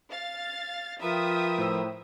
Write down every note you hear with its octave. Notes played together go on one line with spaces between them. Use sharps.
F5 A6
F3 F4 A#4 B4 E5 G5 D#6
A2 C5 E6